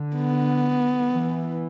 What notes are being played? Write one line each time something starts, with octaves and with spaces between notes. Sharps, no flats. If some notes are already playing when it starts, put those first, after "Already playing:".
Already playing: D3
B3
E3